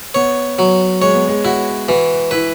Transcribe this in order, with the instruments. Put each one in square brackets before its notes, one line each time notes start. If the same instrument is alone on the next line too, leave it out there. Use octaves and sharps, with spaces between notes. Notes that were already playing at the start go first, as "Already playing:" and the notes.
[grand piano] B3 [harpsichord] C#5
[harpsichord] F#3
[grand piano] G#3 [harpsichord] C#5
[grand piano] B3
G#3
[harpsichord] E4 [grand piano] F#4
[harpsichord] E3 [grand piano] F#4
[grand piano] E4 [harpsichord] B4